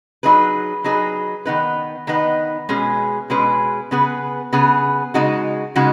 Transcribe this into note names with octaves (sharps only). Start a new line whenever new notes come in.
F#3 D#4 G#4 B4
F#3 D#4 G#4 B4
D#3 B3 D#4 B4
D#3 B3 D#4 B4
B2 G#3 C#4 G#4 B4
B2 G#3 C#4 G#4 B4
C#3 B3 G#4 B4
C#3 B3 G#4 B4
C#3 G#3 D#4 F#4
C#3 G#3 D#4 F#4